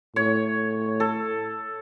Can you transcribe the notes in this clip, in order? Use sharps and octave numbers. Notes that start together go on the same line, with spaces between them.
A2 C#5
A4